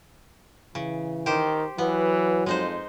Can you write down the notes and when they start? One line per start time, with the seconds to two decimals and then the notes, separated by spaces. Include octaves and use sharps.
0.75 C#3 E3
1.26 D#3 G4 C5
1.78 E3 F#3 B3
2.46 F2 G#3 D#4 C5